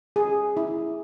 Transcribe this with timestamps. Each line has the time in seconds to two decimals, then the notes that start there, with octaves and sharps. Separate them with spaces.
0.16 G#4
0.57 E4